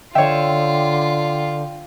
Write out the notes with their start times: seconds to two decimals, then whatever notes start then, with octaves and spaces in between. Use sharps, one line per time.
0.15 D3 F4 C#5 E5 G5